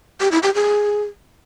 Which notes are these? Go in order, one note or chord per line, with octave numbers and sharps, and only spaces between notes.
G4
E4
G4
G#4